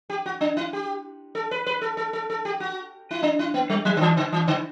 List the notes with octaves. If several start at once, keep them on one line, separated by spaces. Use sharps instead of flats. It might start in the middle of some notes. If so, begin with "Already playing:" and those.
G4
F#4
D4
E4
G4
A4
B4
B4
A4
A4
A4
A4
G4
F#4
E4
D4
E4
B3
G3
F#3
D3
E3
D3
E3
D3